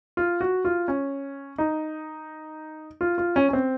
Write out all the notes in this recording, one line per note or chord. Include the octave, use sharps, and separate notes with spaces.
F4
F#4
F4
C#4
D#4
F4
F4
C#4
C#4
C4